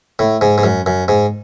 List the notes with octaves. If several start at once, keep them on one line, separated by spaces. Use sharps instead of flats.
A2
G#2
G#2
F#2
F#2
G#2